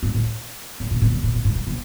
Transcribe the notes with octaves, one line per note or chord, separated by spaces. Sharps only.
G#2
A2
A2
B2
A#2
B2
A#2
A2
G#2
A#2
B2